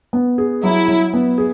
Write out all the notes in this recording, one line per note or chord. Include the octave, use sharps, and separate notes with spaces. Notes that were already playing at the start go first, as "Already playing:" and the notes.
B3
G#4
F#3 E4
F#3
B3
G#4